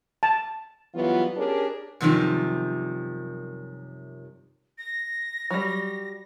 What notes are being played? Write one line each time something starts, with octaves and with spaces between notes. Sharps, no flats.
A5
E3 F#3 G3 B3 F4
C#4 D4 G4 G#4 A#4 D5
F#2 C3 D#3 F3 G3
A#6
F#3 G3